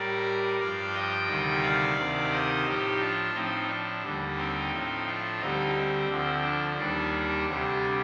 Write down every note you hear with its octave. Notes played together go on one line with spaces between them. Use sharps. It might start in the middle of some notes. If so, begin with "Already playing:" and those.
Already playing: A2 G3 A#4 D5
G2 F3 D5 F5
D#5 G5
D2 C3 D#3 G3
D5 F5
D2 C3 D#3
C5 D#5
A2 F3 D#4 G4
D4 F4
A2 F3 C4 D#4
D4
D#2 D3 G3
C4 D#4
A2 F3
D4 F4
D2 D3 G3 C4 D#4
C4
D2 D3 F3
D4
D#2 D#3 G3 D4
D2 C3 G3